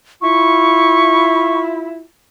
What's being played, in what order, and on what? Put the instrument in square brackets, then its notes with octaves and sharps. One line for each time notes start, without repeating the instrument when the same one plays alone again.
[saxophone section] E4 F4 [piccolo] C#6